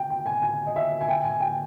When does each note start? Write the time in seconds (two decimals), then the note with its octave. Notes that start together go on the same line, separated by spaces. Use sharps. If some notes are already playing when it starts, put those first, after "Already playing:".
Already playing: G5
0.10 G5
0.26 G#5
0.42 G#5
0.66 D#5
0.76 E5
1.01 G#5
1.09 G5
1.24 G#5
1.41 G5